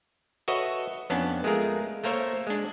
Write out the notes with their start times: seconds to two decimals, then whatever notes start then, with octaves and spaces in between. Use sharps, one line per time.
0.48 F#4 A4 B4 C#5 D#5 E5
1.10 F2 B3 C#4 D4 A5
1.44 G#3 A3 F4 G#4 A#4
2.04 A3 A#3 A#4 C5 C#5 E5
2.47 G#3 D4